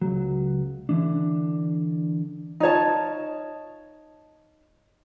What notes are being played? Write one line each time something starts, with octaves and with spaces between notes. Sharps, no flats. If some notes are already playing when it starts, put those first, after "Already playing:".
C#2 F#3
D3 E3 D4
D#4 F4 C#5 A5